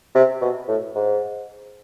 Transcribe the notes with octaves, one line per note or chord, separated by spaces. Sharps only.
C3
B2
A2
G#2